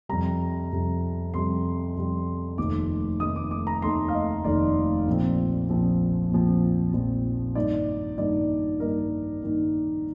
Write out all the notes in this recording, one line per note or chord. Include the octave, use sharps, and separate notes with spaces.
F2 C3 G3 A#5
F2 C3 G3
F2 C3 G3 C6
F2 C3 G3
F1 D#2 D#3 A3 D#4 D6
F1 D#2 D#3 A3 D#4 D#6
D6
D6
A#5
F1 D#2 D#3 A3 D#4 C6
F5
D#5
F1 D#2 D#3 A3 D#4 D5
A#1 A#2 F3 C4
A#1 A#2 F3 C4
A#1 A#2 F3 C4
A#1 A#2 F3 C4
G2 D#3 A#3 D#4 D5
G2 D#3 A#3 D#4 D5
G2 D#3 A#3 D#4 A#4
G2 D#3 A#3 D#4